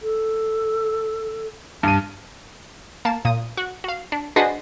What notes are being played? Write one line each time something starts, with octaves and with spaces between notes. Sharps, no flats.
A4
G2 A5 D#7
A#3 A5
A#2 D#6
F#4
F#4 F5
D4
D4 F#4 G#4 B4 C5 D#5